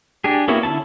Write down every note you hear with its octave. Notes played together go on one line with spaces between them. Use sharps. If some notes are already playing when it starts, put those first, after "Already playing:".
D4 G4 G#4
A#3 B3 C#4 E4 F#4
D3 C#4 E4 A5